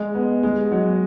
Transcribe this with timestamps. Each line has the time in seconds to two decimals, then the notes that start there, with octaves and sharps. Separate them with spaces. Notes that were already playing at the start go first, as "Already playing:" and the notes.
Already playing: G#3
0.15 B3
0.43 G#3
0.72 F#3